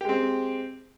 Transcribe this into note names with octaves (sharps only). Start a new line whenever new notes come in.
G#3 C4 G4